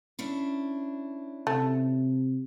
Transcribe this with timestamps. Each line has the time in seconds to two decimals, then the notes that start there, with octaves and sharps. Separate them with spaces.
0.19 C#4 D4 E4
1.47 C3 A3